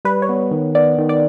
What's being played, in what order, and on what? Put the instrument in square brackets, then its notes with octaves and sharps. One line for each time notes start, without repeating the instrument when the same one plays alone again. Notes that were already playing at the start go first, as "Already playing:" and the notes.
[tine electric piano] G3 [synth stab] B4
[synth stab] C#5
[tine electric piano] B3
D#3
[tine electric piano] B3 [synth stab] D5
[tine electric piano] D#3
[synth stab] D5